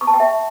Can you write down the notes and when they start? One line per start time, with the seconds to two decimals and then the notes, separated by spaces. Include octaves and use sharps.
0.01 C#6
0.07 A5
0.14 G5
0.20 E5